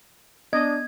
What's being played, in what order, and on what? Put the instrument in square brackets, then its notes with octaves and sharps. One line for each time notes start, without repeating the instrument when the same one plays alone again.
[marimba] B3 D#6 [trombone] D4 [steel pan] D#5 [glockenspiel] G#6